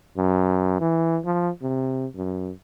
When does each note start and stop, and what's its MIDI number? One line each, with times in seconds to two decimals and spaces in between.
0.17 0.77 42
0.80 1.19 52
1.25 1.50 53
1.62 2.06 48
2.16 2.50 42